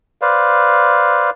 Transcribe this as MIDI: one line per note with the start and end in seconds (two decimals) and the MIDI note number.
0.22 1.30 71
0.22 1.30 72
0.22 1.30 74
0.22 1.30 77